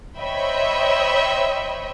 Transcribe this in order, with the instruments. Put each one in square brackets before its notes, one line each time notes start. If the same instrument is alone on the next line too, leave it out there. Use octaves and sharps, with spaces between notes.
[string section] C5 C#5 D#5 E5 G5 B5